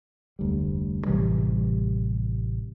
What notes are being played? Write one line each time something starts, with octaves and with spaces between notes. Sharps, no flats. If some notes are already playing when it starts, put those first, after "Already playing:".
F1 D2 G3
A1 C3 E3 G3